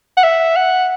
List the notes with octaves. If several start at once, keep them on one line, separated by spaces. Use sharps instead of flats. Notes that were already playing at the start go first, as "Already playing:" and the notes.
F#5
E5
F#5